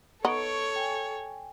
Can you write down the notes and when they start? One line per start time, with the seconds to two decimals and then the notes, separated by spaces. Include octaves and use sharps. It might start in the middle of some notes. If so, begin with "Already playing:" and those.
0.25 B3 D#4 A4 C#5 C#6 D7
0.76 G5 G#5